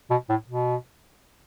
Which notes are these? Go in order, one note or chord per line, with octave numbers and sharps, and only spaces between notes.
B2
A2
B2